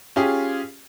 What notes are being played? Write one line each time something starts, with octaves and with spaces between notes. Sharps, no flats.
C#4 F4 G4 G#4